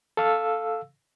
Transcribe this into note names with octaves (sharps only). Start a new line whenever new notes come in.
A4 F5 E6